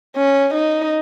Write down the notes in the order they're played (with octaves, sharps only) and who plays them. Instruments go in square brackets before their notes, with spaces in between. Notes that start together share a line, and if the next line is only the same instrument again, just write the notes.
[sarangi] C#4
D#4